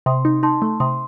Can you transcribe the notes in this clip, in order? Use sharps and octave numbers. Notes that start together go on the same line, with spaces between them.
C3 C6 D#6
D#4
D#4 A5 C6
A3
C3 C6 D#6